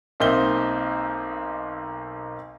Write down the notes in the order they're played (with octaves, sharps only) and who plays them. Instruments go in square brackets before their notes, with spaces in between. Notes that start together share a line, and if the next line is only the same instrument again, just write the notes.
[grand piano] B1 A#3 C4 D#4 E5 G7